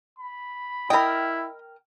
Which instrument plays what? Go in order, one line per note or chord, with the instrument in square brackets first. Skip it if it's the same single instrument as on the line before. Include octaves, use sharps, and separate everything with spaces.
[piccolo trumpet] B5
[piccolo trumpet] E4 [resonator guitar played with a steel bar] A#4 G5 [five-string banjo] D#5 B5